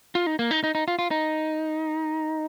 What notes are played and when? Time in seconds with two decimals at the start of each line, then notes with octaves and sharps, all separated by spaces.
0.15 F4
0.27 D#4
0.39 A#3
0.51 D#4
0.64 D#4
0.75 D#4
0.88 F4
0.99 F4
1.11 D#4